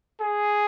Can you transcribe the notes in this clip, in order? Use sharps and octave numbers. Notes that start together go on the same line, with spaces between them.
G#4